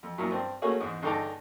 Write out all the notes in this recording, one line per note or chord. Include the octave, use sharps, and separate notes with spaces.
F2
F#2 A#2 E4 A#4
G2 C4
A3 A#3 C#4 F#4 G#4
E2 G#2 D#6
C#2 G2 D3 D#4 A#5 D6